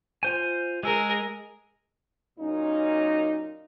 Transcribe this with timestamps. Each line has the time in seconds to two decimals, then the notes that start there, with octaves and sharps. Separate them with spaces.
0.23 F4 C5 G#5
0.83 G#3 G#4 A#4 E6
2.39 F#2 A#2 C#4 D#4